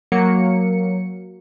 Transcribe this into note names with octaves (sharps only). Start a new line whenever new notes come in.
F#3 A#3 C#7